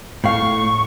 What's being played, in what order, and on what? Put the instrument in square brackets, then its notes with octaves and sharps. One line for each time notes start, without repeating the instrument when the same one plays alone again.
[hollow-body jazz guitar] A2 F5 [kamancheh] C#6